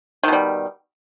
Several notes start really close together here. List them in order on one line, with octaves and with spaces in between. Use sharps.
D#3 B2 G3